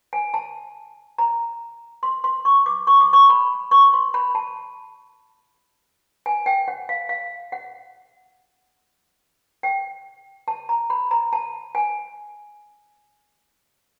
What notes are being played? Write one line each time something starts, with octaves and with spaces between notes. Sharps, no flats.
G#5
A5
A#5
C6
C6
C#6
D6
C#6
D6
C#6
B5
C#6
C6
B5
A5
G#5
G5
F#5
F5
F5
F#5
G5
A5
A#5
B5
A#5
A5
G#5